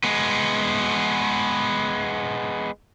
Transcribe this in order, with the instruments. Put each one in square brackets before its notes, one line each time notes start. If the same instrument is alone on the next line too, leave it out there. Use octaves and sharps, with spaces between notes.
[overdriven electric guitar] G#3 B3